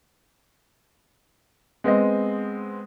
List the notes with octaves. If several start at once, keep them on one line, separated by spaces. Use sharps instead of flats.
G#3 B3 C4 D#5